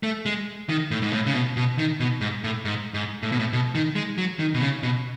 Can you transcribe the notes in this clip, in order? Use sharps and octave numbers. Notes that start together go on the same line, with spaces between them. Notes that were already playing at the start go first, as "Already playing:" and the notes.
A3
G#3
D#3
A2
G#2
A2
C#3
B2
B2
D#3
B2
G#2
A2
G#2
G#2
A2
B2
A2
B2
D#3
G#3
F#3
D#3
B2
C#3
B2